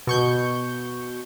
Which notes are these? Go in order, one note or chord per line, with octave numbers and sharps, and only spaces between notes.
B2 C#6 G6